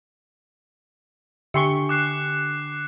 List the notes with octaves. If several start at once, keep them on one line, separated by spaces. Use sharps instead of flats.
D3 G4 E5 G5 G#5 C6 C#6 C#7
D6 F#6 C7